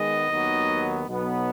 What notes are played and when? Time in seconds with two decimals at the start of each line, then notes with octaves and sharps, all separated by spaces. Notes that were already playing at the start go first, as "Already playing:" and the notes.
Already playing: D#3 G#3 B3 D#5
0.29 D#2 D#3 F#3 B3
1.07 B1 B2 F#3 B3